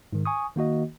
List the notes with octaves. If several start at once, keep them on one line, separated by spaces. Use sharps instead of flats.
G#2 D#3
G#5 C#6 D#6
D#3 A#3 F#4 D#5